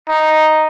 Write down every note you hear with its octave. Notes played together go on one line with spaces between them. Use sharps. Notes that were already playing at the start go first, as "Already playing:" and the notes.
D#4